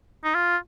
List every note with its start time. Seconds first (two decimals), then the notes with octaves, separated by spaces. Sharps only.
0.24 D#4
0.35 F4